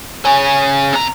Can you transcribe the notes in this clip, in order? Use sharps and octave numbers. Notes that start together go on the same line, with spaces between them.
C#4 G#4
C3 A#5